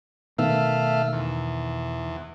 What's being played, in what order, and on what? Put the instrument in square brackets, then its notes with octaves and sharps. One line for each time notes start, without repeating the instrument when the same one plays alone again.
[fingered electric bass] B2 D#3 [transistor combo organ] A3 E5 F5
[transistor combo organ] E2